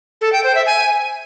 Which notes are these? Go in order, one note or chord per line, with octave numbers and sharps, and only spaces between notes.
A4
G5
C5
E5
G#5